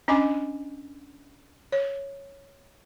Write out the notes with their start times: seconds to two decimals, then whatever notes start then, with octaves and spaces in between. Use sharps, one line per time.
0.08 C#4 D4 D#5 G#5 D6
1.72 C#5